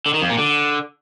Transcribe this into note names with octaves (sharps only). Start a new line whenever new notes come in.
D3
D#3
F2
A#2
D3